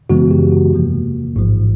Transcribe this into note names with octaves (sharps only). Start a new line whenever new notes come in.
F#2 C#3 E3 G#3 B3 F#4
G4
F#4
E2 C3 F3 A#3
A1 G#2 F3